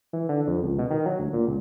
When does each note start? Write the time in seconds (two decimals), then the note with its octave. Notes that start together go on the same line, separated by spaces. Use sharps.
0.13 E3
0.29 D3
0.47 F2
0.63 C#2
0.79 B2
0.90 D#3
1.06 F#3
1.19 D2
1.33 A#2
1.47 C#2